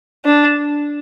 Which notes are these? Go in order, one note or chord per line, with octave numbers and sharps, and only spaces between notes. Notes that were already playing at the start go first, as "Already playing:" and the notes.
D4